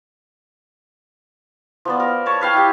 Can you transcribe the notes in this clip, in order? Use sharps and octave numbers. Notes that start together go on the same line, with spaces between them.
F3 B3 D5
A#4
C#5 A5 B5
B4 F5 G5
E4 G4